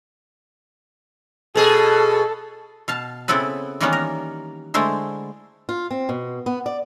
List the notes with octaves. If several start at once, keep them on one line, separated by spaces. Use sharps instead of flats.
B2 G#4 A4
B2 F5 A5
C#3 B3 C4 E4 A4 B4
D#3 E3 G3 A#3 B3 C#4
A#4
D3 G#3 A3 E4 C5
F4
C4
B2
B3
D5